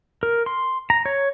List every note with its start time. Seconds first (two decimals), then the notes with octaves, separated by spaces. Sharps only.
0.23 A#4
0.46 C6
0.90 A#5
1.06 C#5